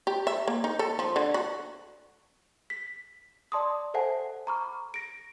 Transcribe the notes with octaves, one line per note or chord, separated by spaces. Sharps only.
G4
E5
A#3
D#4
A4
F3
D3
F#4
B6
D5 A5 C6 D6 D#6
A4 C5 E5 F#5 G#5 A5
A#5 B5 C#6 D6 F6
A#6 D7